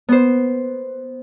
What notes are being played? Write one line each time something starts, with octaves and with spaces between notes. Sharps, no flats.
B3 C5